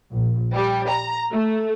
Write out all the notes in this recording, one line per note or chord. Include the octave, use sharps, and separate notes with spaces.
A#1
G3
A#5
A3